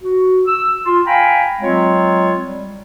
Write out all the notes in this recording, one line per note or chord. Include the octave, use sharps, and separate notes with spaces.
F#4
E6
F4
F5 G5 G#5 A#5 B5
F#3 G#3 C4 F4 C#5
G3